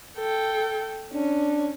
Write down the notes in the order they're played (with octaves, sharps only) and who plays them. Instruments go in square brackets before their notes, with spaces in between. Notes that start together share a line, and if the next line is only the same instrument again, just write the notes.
[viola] A4 G5
[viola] C#4 [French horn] D4